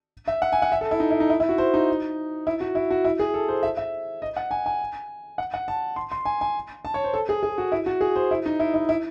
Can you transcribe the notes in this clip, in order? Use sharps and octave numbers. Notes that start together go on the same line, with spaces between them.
E5
F#5
G#5
F#5
E5
A4
E4
D#4
E4
D#4
E4
E4
F#4
C5
D#4
E4
F#4
E4
F#4
E4
G#4
A4
C5
E5
E5
D#5
F#5
G#5
G#5
F#5
F#5
A5
C6
C6
G#5
G#5
A5
C#5
C5
A4
G#4
G#4
F#4
E4
F#4
G#4
C5
E4
D#4
E4
E4
E4